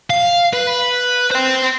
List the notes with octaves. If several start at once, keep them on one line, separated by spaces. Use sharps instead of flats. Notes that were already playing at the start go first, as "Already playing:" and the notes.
F5
B4
C5 G5